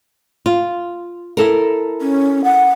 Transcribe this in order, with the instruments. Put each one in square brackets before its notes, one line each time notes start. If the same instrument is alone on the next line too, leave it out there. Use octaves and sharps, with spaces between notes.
[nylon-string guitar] F4
E4 A4 A#4
[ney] C#4
F#5